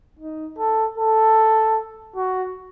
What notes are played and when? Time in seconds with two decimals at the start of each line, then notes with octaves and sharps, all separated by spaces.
0.19 D#4
0.58 A4
0.98 A4
2.16 F#4